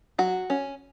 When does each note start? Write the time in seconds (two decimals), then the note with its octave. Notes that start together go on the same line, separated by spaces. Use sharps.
0.18 F#3 F#4
0.50 C#4